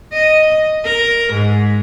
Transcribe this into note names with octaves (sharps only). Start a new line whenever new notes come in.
D#5
A#4
G#2